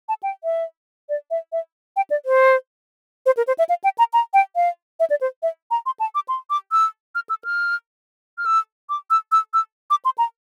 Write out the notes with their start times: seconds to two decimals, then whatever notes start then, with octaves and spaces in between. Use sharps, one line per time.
0.09 A5
0.23 G5
0.44 E5
1.09 D5
1.31 E5
1.52 E5
1.96 G5
2.10 D5
2.26 C5
3.26 C5
3.37 A#4
3.47 C5
3.58 E5
3.69 F5
3.84 G5
3.98 A#5
4.13 A#5
4.34 G5
4.56 F5
5.00 E5
5.10 D5
5.21 C5
5.43 E5
5.71 A#5
5.86 C6
6.00 A5
6.15 D6
6.28 C6
6.50 D6
6.72 E6
7.15 F6
7.29 E6
7.44 F6
8.38 F6
8.46 E6
8.89 D6
9.10 E6
9.32 E6
9.54 E6
9.90 D6
10.05 C6
10.18 A#5